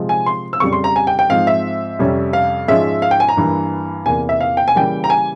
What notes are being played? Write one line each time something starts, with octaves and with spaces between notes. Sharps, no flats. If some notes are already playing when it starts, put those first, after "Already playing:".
Already playing: C3 F3 G#3 C4
G#5
C6
E6
F2 C#3 G3 C#6
C6
A#5
G#5
G5
G5
G#2 F3 C4 F5
E5
F2 C3 G3 C#4
F5
G#2 F3 G#3 C#4 E5
F5
G5
G#5
A#5
G2 E3 A#3
E2 C3 E3 A#3 G#5
E5
F5
G5
G#5
C#3 E3 G3 A#3 G5
A#5
G#5